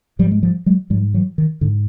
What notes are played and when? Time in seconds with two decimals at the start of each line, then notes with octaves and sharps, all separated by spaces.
0.19 G#2 F3 G3
0.31 G#3
0.43 F3 G3
0.66 F#3 G#3
0.90 G#2 F3 G3
1.14 E3 F#3
1.38 D#3
1.61 G#2 D3